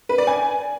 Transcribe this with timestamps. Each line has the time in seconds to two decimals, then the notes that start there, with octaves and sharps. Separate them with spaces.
0.09 B4
0.18 D5
0.27 G#5